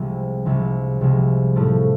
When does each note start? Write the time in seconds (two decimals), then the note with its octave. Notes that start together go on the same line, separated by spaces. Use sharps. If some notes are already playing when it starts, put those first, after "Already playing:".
Already playing: C2 C3 F3 G#3
0.45 C2 C3 F3 G#3
1.01 C2 C3 F3 G#3
1.56 A2 F3 A3